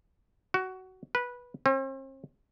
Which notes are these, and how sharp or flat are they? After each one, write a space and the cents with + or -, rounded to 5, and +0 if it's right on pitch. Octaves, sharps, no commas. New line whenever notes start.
F#4 +15
B4 -15
C4 +45